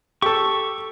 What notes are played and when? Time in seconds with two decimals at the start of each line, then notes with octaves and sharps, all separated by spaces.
0.22 G4 A4 C#6